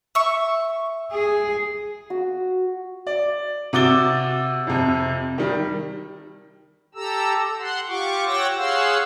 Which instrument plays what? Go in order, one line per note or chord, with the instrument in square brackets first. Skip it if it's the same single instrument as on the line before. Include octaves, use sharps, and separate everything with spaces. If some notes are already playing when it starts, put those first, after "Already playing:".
[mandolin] E5 C#6
[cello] G#4
[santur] F#4
[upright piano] D5
C3 F#4 D6 A6 G7
F2 C3
D#3 G3
[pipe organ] G4 A4 A#5 E6
F#5 C6
F4 G4 C#6 D6
C#5 F#5 G5 E6 A#6
G#4 C#5 F5 F#5 C6 E6